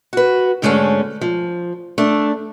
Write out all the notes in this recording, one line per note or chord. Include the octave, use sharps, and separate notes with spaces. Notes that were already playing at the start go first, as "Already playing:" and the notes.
F#4 B4
G#2 D3 G#3 A3 B3 C#4
F3
A3 D4